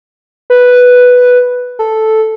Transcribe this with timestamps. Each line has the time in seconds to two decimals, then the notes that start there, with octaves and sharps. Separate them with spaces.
0.50 B4
1.79 A4